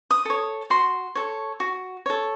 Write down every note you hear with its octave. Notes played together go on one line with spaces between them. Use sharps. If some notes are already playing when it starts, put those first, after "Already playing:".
D#6
A4 C#5
F#4 C6
A4 C#5
F#4
A4 C#5